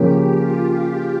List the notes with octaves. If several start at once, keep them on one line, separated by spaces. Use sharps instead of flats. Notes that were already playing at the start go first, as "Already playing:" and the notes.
Already playing: C#3 F3 A#3 C#4 G4
F4